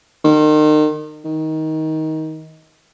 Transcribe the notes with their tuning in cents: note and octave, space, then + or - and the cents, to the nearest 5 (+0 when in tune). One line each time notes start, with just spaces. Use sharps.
D#3 -35
D#3 +20